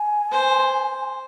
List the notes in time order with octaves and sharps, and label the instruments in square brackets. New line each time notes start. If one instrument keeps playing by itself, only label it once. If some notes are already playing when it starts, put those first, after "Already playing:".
Already playing: [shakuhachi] G#5
[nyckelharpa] C5